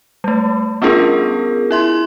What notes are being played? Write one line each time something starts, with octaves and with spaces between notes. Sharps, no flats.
G3 A3
B3 C#4 D4 F4 G#4 A#4
E4 E5 C6